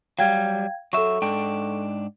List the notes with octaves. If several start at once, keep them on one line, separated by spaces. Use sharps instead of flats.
F#3 G3 F5 G5 G#6
F#3 A4 E5 C#6
G#2 D4 G5